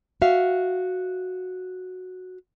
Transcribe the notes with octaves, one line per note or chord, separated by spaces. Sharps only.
F#4 E5 F5